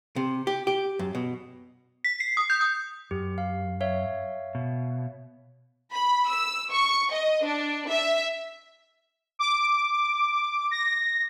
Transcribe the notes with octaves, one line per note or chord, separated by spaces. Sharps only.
C3
G4
G4
F#2
B2
B6
C7
D#6
G6
D#6
F#2 G4
F5
C#5 E5 F5
B2
B5
E6
C#6
D#5
D4
E5
D6
A#6